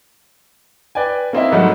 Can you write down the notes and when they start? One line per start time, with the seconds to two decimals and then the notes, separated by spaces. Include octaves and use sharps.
0.95 B4 D5 G5 G#5
1.33 A#3 C4 D#4 E4
1.51 G#2 D#3 F#3 G3 A3